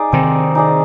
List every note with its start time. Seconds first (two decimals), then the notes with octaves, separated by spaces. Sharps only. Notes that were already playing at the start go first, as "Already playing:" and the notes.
Already playing: D#4 G#4 D5
0.12 C3 D#3 C4
0.55 D#4 G#4 D5